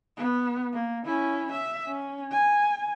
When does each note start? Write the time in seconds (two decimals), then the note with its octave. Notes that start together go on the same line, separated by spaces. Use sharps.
0.17 B3
0.73 A#3
1.06 C#4 E4
1.53 E5
1.87 C#4
2.32 G#5